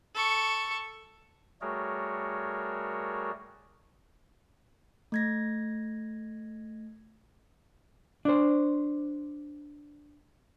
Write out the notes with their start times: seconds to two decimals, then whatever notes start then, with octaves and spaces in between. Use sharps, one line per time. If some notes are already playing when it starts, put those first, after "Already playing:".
0.15 A4 C#6
1.61 G3 A3 F#4 G#4 A#4 C#5
5.12 A3 G#6 A#6
8.25 D4 C5